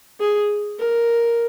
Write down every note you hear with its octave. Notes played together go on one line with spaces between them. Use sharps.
G#4
A#4